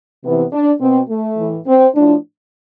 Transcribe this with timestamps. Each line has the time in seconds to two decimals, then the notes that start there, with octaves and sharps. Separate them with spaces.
0.24 C3 E3 B3
0.52 D4
0.80 B2 C4
1.08 A3
1.37 A2 E3
1.67 C4
1.95 A2 F3 D4